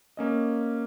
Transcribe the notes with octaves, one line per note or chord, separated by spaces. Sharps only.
A#3 C#4 D#5